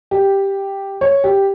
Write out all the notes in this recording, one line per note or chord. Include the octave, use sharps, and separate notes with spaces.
G4
C#5
G4